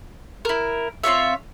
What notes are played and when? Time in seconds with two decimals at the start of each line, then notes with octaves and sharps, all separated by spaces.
0.45 E4 A#4
1.04 C4 F4 C#5 E5